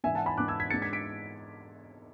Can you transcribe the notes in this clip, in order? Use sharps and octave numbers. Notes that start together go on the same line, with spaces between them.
G#2 E3 B3 E5 G#5
F#5 A5
G#5 B5
G#2 E3 B3 D6 F#6
E6 G#6
G#6 B6
G#2 G#3 B3 D4 A6 C#7
G#6 B6
B6 D7